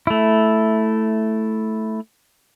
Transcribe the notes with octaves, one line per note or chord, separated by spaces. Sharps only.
A3 E4